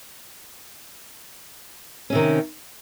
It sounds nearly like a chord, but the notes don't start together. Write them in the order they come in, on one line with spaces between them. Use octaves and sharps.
C#4 C3 D#3